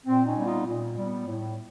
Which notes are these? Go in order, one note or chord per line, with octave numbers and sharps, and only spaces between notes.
A#2 C4
C#4 D#4
G3 B3
D#4 F4
A#2
G3 B3
A2